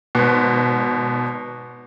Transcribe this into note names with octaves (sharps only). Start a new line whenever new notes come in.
G#1 B2